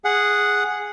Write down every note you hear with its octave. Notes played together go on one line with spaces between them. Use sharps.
G#4 F#5